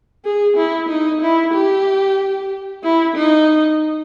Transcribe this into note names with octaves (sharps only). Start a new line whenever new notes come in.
G#4
E4
D#4
E4
G4
E4
D#4